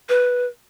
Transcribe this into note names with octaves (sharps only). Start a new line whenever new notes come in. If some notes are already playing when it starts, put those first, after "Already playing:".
B4